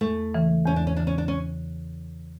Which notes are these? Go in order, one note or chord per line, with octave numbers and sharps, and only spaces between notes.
E2 A3
C#3 E3
E2 C#4
D4
C#4
C#3 E3 D4
C#4
D4
C#4